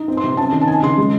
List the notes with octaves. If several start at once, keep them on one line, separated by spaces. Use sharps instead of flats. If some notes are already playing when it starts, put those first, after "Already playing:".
Already playing: D#4
C4
C6
C3
C#4 A5
D#3
A5
D#4 G#5
C#3 C6
G#3